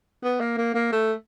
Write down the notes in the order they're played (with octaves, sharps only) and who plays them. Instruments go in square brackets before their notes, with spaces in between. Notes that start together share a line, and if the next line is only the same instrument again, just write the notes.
[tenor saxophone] B3
A#3
A#3
A#3
A3